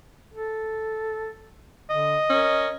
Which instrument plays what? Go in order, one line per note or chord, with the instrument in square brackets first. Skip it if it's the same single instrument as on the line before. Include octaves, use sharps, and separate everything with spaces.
[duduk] A4
[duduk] D3 [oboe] D#5
[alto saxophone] C#4 [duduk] A#4